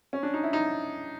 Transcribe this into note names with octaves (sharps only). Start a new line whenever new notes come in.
C#4
D4
D#4
E4
D#4